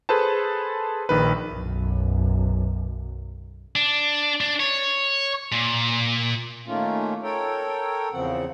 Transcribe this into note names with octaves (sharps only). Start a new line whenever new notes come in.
G#4 A4 B4 C5 A5
A#1 D#3 B4
B1 F#2
D4
D4
C#5
A#2
D#3 A3 A#3 C#4 F4
A4 A#4 C#5 G5
E2 C#3 F3 C4 F#5